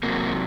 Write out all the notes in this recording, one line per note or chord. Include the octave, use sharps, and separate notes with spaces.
C3 F#3 A#3